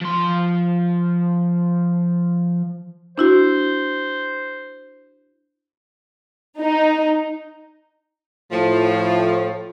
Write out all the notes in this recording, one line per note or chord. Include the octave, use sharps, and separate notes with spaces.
F3 C6
D4 E4 F#4 C5
D#4
A2 F3